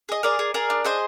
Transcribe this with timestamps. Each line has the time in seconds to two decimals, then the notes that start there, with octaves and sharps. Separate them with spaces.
0.09 G#4 D#5
0.23 G#4 A#4 D5
0.39 G#4
0.54 G#4 A#4 D5
0.70 D4
0.85 G#4 C5 D#5